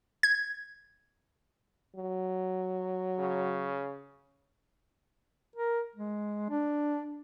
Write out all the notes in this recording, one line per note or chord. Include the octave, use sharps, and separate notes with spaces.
G#6
F#3
C#3
A#4
G#3
D4